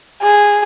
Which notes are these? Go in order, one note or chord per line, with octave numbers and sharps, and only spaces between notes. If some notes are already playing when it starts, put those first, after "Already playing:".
G#4